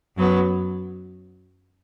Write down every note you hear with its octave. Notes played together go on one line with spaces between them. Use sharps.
F#2 F#3 B3